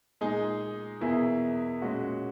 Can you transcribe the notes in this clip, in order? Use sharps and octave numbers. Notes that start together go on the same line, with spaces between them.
A#2 G#3 D#4 G#4
E2 B2 A#3 E4 G#4
A#2 G#3 C#4 F#4